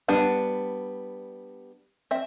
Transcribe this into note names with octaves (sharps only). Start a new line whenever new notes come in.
G3 B3 D4 F#5
C4 E5